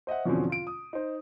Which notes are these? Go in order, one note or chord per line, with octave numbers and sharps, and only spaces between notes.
C5 D#5 E5 F#5
E2 B2 D3 F3 C4 C#4
F4 D7
D#6
D#4 C5